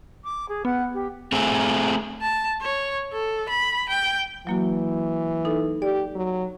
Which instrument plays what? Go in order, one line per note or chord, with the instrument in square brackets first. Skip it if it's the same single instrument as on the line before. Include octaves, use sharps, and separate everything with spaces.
[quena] D6
G#4
[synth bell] B3 [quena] F#5
[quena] G4
[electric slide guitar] A3 C4 G#4
[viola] A5
C#5
A4
B5
G5
[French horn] E3 [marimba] F#3 A#3 F#4
[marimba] D#4 A4
[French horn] G4 [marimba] D5
[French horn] F#3